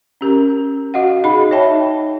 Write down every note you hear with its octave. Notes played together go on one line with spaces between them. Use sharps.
C#4 G4 A#4 A#5
F#4 D#5 F5 F#5
D#4 G#4 D#5 B5
D#4 C#5 D#5 E5 G5 A5